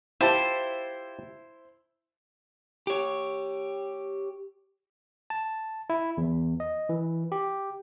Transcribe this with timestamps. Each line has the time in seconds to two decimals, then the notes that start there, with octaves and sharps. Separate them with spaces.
0.21 E4 F4 G4 C5 A5
2.87 G4 C#5
5.30 A5
5.90 E4
6.17 E2
6.60 D#5
6.89 E3
7.32 G4